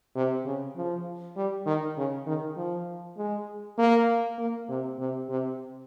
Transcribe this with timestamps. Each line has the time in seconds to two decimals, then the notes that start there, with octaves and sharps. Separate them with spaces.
0.16 C3
0.46 C#3
0.76 F3
1.37 G3
1.66 D#3
1.97 C#3
2.26 D#3
2.57 F3
3.17 G#3
3.78 A#3
4.38 A#3
4.69 C3
4.99 C3
5.29 C3